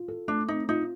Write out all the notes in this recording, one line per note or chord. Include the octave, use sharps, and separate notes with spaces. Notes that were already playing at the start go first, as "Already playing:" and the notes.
Already playing: F4
A4
A3 D4
C4 D#4
D#4 F4